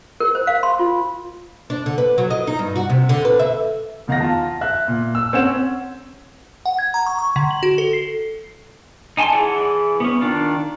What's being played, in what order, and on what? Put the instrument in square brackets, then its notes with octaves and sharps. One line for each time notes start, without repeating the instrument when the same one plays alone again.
[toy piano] A#4
C5
F5
C6
F4
[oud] D4
D3
B4
F#3
D#5
D#4
G2
F#4
C3
D3
B4
E5
[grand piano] E2 D#3 F5 F#5 A#6
F4 A5
E5 F#6
A#2
E6
C4 C#4 F#5 E7
[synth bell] F#5
G#6
A#5
C#6
C#6
D3
F#7
F#4
A4
C7
[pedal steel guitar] D#4 G#5 A5 C6
E3 E4 G#4 D5 F#5
B3 C#4
D#3 D4 F4